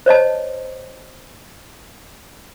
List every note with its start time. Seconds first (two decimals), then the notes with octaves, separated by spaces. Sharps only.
0.06 C5 C#5 D#5 A5